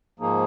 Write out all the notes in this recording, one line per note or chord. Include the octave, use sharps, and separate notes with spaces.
G#2 F3 A#3 D#4 G#4